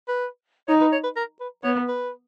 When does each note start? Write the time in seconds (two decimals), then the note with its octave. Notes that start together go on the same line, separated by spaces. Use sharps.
0.08 B4
0.68 D#4 C#5
0.81 B4
0.92 C#5
1.04 B4
1.16 A#4
1.40 B4
1.64 B3 C#5
1.88 B4